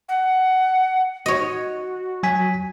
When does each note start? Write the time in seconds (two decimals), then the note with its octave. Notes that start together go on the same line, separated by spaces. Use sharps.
0.09 F#5
1.26 F#4 C#5 D#5
2.23 F#3 G#5 B6